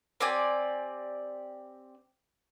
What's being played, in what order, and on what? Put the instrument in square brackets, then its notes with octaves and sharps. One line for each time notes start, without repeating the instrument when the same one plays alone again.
[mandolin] C4 G4 D5 G#5